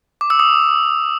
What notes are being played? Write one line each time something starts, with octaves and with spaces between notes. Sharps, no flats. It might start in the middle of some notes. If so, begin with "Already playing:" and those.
D6
E6
D#6